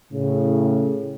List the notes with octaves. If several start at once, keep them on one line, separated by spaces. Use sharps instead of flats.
A2 C#3